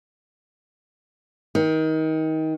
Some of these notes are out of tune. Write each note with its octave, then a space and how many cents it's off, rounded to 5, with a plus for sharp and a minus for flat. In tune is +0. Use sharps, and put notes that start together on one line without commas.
D#3 +25